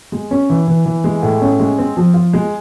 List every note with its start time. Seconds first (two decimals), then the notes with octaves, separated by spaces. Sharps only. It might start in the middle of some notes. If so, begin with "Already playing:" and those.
0.12 G#3
0.31 C#4
0.50 E3
0.68 E3
0.86 E3
1.04 G#3
1.23 A2
1.41 C#4
1.60 G#3
1.78 C4
1.97 F3
2.14 F4
2.33 G#3